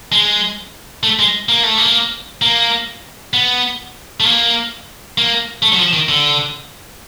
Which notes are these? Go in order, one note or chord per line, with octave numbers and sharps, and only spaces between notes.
G#3
A3
G#3
A#3
A3
A#3
A#3
B3
A3
A#3
A#3
A3
F#3
F3
D#3
D3